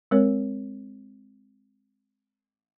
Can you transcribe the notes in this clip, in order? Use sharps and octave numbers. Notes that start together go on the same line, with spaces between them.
G#3 C4 A#4 C#5